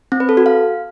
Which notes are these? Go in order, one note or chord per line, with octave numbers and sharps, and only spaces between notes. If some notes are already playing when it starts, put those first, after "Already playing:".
C4
B4
A4
F#4
F5